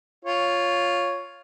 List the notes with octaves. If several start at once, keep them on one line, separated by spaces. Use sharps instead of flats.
F4 C#5